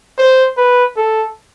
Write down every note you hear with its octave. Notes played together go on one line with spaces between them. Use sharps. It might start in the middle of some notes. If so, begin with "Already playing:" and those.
C5
B4
A4